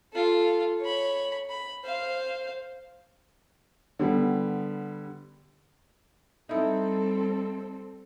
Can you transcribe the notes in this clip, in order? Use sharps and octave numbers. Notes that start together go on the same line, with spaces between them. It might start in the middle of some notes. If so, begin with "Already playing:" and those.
F4 A4
C#5 B5
B5
C5 F5
D3 G3 B3
G3 C4 D#4 E4 A4